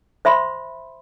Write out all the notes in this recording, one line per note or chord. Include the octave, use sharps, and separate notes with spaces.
C5 E5 B5 C6